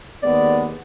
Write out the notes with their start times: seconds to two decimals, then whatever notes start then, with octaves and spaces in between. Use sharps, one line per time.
0.23 D#2 G#3 B3 D5